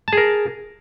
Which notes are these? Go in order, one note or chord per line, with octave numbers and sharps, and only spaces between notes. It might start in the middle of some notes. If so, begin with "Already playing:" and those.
G#4 A#4 A5